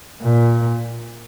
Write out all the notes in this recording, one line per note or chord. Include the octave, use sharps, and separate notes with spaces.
A#2